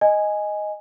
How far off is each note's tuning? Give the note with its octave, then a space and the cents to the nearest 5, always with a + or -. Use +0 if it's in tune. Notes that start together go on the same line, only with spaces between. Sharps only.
D#5 +0 G#5 +0